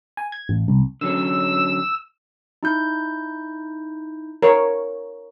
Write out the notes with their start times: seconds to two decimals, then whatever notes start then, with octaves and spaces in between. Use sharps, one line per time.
0.17 G#5
0.32 G#6
0.49 A1
0.68 C2
1.01 D3 F#3 C#4 E6
2.63 D#4 E4 G6
4.42 A#4 C#5